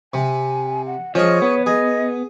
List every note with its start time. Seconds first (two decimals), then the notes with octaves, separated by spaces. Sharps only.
0.14 C3 G#5
0.86 F#5
1.15 F3 C#4 G#4 D#5
1.42 B3 C#5
1.66 G#4 D#5